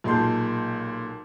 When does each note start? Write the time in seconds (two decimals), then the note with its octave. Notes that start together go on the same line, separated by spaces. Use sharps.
0.04 B1 A#2 G#3 A5 C6 G6